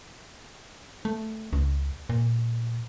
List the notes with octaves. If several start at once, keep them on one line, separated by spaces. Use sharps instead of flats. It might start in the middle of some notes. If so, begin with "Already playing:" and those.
A3
C#2
A#2